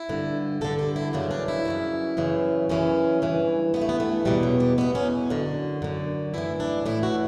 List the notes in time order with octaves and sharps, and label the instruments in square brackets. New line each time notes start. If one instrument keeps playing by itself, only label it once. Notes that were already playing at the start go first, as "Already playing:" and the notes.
Already playing: [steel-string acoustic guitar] E4
G2 D3
G2 D3 A4
G4
E4
F#2 C#3 E3 D4
D4
E4
F#2 C#3 E3
F#2 C#3 E3
F#2 C#3 E3 C#4
G2 E3
G2 E3 B3
A3
B3
A3
E2 B2 G3
F#3
G3
E2 B2 B3
C#4
F#2 D3
F#2 D3
A2 E3 E4
D4
A2 E3 E4
F#4